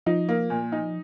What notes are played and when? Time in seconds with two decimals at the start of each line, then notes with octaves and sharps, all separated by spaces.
0.06 F3 D#4
0.29 A#3
0.50 A#2
0.72 D#4